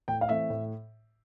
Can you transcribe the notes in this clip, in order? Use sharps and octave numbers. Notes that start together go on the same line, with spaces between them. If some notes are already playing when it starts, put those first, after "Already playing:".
A2 G5
F5
E3 A3 C4 E5
A2